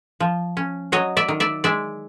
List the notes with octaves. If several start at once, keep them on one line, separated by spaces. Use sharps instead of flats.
F3
C#4
F#3 C#5 D#5
D5 E5
D#3
D5 E5
G#3 D5 E5